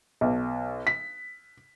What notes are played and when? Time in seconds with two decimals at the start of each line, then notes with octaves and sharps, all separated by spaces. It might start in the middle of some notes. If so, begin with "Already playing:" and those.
0.21 B1
0.87 B6